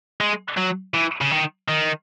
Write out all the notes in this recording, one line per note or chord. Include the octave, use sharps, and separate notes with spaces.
G#3
F#3
E3
C#3
D#3
D#3